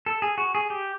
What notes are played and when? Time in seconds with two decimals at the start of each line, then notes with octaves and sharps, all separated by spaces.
0.06 A4
0.22 G#4
0.38 F#4
0.55 G#4
0.70 G4